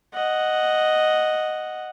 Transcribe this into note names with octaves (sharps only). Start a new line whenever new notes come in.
D#5 F#5